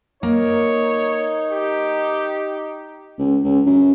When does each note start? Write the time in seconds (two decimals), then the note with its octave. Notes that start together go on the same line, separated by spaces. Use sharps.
0.23 A#3 D#4 C#5
1.52 G4
3.18 C#2
3.44 C#2
3.66 F#2